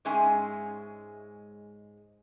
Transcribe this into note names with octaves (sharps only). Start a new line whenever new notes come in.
G#2 G#3 C#4 E5 G#5